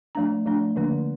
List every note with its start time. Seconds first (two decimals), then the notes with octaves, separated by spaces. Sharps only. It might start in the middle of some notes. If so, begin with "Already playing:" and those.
0.15 F3 A3 D4 A#5
0.46 F3 A3 D4
0.76 D3 F3 A#3 D4